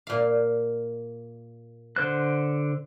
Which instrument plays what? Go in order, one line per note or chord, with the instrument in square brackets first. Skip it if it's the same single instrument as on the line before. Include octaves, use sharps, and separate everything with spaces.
[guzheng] A#2 F5
[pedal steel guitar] D3 C5 F#6